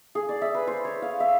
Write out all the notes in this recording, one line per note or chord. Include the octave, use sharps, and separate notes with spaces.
G#4
D5
E5
B4
C5
C#5
F5
E5